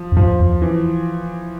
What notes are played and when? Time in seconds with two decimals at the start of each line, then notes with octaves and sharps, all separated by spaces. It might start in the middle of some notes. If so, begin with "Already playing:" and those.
Already playing: F3
0.12 F2
0.17 G2 F3
0.40 E2
0.62 E3